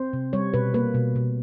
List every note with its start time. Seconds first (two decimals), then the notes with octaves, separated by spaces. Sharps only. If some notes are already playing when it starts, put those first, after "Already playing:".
Already playing: C4 C5
0.13 C3
0.33 G3 C#5
0.54 B2 B4
0.74 A#3 B4
0.94 B2
1.16 B2